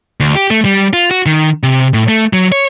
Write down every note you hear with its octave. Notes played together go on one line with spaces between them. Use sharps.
D2
G4
A3
G3
F4
F#4
D#3
C3
A2
A3
F#3
C#5